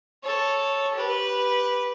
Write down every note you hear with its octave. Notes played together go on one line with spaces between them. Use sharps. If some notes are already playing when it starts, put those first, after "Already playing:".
A4 C#5
G4 B4